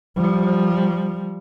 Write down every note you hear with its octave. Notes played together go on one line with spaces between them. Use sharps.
F3 G3